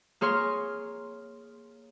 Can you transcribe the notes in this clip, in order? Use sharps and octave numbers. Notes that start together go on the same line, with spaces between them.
A#3 G#4 C#5 C6 F6